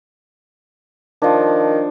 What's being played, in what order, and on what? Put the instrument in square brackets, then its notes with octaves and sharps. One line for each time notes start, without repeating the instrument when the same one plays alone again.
[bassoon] D#3 [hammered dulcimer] F3 D4